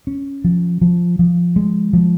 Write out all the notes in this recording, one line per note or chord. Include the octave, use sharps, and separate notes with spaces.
C#4
F3
F3
F3
G#3
F3